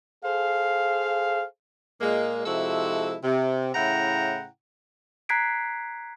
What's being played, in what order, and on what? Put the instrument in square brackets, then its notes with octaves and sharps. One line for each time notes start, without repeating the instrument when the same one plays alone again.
[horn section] G#4 A4 C5 F5
A#2 G#3 A#3
C3 F3 G#3 E4 F#4 A4
C3
A2 C#3 E4 F#5 G5 A#5
[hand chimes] A#5 F#6 G#6 B6 C7 D7